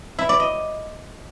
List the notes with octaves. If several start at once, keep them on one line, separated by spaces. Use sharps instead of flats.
E4
D5
D#5